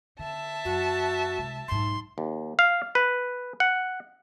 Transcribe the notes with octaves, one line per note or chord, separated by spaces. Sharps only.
D3 E5 A5
F#2 F#4
C2 G#3
B1 G#2 C6
D#2
F5
B4
F#5